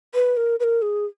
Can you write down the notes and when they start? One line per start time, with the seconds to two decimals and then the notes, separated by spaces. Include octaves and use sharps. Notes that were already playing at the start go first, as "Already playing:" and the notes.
0.14 B4
0.37 A#4
0.60 B4
0.64 A#4
0.82 G#4